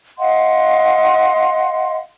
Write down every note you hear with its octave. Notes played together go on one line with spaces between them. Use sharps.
D#5 F5 F#5 C6